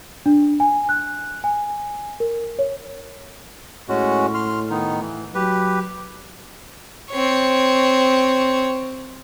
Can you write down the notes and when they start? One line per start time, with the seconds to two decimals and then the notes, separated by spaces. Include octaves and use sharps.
0.26 D4
0.60 G#5
0.89 F#6
1.44 G#5
2.20 A#4
2.59 C#5
3.89 A2 G#3 C#4 F#4
4.34 C6 F6
4.70 D#3 B3 D#4
5.01 E3
5.35 F#3 G4 B4
7.11 C4 C#5